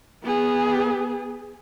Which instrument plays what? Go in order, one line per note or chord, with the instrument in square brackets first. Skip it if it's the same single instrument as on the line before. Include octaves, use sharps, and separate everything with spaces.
[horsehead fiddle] B3 G#4